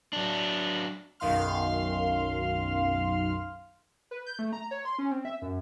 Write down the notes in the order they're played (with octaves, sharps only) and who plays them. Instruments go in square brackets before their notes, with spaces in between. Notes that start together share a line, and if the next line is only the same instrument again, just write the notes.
[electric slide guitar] F#3 D4
[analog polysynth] B1 F#2 D#3 F5 C6 F6
[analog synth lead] B4
G6
A3
A#5
C#5
C6
C#4
C4
E5
F#2